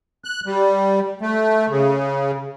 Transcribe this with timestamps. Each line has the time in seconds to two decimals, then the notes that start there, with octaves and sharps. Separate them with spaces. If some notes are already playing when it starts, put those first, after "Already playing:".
0.25 F#6
0.46 G3
1.22 A3
1.69 C#3